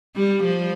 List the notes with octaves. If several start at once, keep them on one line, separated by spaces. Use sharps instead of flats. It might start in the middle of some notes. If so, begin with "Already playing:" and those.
G3
F3